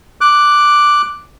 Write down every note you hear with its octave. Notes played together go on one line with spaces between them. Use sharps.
D6 F#6